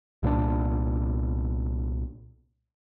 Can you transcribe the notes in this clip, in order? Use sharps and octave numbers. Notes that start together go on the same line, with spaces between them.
C2 A#2 C#4 D4